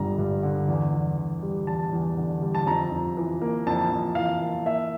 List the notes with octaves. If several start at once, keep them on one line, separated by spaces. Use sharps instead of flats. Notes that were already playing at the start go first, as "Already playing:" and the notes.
Already playing: G1 G2 D3 G3 A#5
G2
D3
E2
E2
D3
G3
E2 A5
E2
D3
G3
A5
F2 A#5
F2
E3
A#3
F2 A5
F2
E3 F5
A#3
A#3 E5